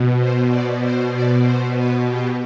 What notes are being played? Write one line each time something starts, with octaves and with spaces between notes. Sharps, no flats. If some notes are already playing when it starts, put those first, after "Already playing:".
Already playing: B2
C5
D5
C5
D5
C5
B4
G4